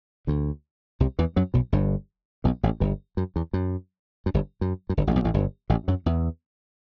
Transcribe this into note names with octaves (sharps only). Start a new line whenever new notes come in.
D2 D3
C2 C3
E2 E3
F#2 F#3
B1 B2
G1 G2
B1 B2
A1 A2
G1 G2
F#2
E2
F#2
F#2
G1 G2
F#2
F#2
G1 G2
A1 A2
B1 B2
A1 A2
G1 G2
A1 A2
F#2 F#3
E2 E3